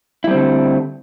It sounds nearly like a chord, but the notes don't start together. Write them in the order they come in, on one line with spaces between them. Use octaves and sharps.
E4 G3 C4 D3 A3